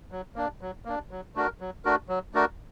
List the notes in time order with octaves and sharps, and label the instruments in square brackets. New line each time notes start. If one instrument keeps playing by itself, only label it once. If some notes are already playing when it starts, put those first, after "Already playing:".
[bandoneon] F#3
A#3 D4
F#3
A#3 D4
F#3
A3 D4 F#4 A#4
F#3
A3 D4 F#4 A#4
F#3
A3 D4 F#4 A#4